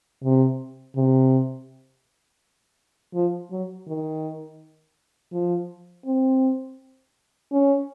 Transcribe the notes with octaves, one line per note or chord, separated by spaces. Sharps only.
C3
C3
F3
F#3
D#3
F3
C4
C#4